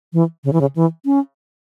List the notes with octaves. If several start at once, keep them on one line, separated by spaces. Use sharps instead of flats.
E3
C#3
E3
C#3
E3
C#4